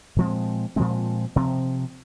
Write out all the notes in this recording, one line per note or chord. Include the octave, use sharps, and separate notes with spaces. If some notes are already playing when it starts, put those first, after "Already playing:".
A#2 F3 G#3 C4
A#2 F3 G#3 C4
C3 F3 C4